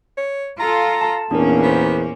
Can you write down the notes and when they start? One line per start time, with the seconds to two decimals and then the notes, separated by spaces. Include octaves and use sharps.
0.18 C#5
0.60 F4 A4 A#5
1.01 A5
1.31 E2 A#2 A#3 C#4 D4 A#4
1.63 B3 A#4 C5